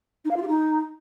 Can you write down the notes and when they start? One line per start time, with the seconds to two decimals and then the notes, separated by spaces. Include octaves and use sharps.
0.24 D#4
0.30 F5
0.36 F4
0.42 G4
0.48 D#4